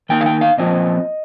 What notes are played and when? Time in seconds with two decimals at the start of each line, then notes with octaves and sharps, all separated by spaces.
0.09 D#3 A#3 D#4 G5
0.21 F5
0.26 G5
0.41 F5
0.58 A#2 F3 C4 F4 D#5